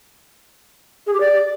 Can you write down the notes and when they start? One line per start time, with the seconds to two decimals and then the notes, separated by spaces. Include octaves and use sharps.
1.07 G#4
1.14 G4
1.20 D5